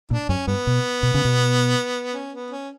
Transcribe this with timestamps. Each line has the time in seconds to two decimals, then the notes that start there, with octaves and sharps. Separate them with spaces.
0.11 A#2 D4
0.29 F#2 C#4
0.47 G2 B3
0.67 B2
1.03 B2
1.14 C#3
1.25 B2
2.13 C#4
2.33 B3
2.50 C#4